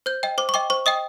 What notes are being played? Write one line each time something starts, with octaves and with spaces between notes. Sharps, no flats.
C5 G6
D#5 G5
C5 D6
C#6
D#5 G5 D6
C5 C#6
D#5 G5 D#6